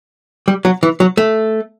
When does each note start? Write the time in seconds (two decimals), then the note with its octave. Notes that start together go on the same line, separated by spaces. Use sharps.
0.48 G3
0.65 F#3
0.83 E3
1.00 F#3
1.17 A3